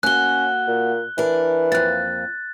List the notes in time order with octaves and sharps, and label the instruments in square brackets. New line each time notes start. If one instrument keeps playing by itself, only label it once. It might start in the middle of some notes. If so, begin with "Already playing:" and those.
[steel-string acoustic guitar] A#3 F#4 [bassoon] C#4 [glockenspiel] F#6 G7
[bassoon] A#2
[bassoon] E3 [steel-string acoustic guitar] D4 A#4
[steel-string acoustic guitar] F2 A#3 [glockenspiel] F#6 A6